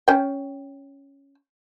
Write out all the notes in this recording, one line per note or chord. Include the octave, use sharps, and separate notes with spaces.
C#4 G5